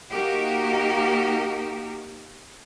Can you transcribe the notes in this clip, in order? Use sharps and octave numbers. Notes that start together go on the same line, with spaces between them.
A#3 D#4 F#4 G4 A#4